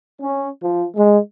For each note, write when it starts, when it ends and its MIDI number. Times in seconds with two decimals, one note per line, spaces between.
0.21 0.48 61
0.61 0.86 53
0.96 1.18 56